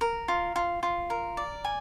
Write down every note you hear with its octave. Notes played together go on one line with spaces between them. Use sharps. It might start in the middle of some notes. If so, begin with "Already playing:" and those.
A#4
F4
F4
F4
A#4
D5
G#5